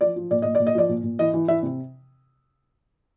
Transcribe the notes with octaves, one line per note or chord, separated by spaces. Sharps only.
F3 D5
F3
A#2 D5
A#2 D#5
D5
A#2
D#5
F3 D5
A#2
A#2
E3 D#5
E3
E3 E5
C3